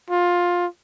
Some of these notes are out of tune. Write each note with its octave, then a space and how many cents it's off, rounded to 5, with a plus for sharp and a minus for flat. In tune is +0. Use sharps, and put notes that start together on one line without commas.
F4 +15